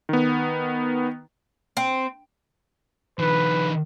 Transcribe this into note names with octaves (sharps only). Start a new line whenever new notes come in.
D#3 B3
C4
D#3 F3 B4